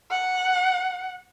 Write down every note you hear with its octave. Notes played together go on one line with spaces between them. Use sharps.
F#5